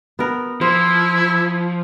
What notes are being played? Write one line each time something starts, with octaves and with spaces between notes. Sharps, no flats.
B3 A#4
F3 E4 C5